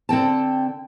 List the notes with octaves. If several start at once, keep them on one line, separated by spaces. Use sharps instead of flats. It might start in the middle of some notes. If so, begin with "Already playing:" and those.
D3 C4 G5 A5